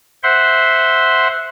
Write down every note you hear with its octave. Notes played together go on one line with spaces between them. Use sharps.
C5 E5 F#5 C6